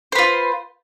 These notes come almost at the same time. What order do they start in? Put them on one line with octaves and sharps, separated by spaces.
C5 B4 F4